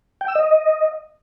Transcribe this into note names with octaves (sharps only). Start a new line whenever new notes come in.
G5
E6
D#5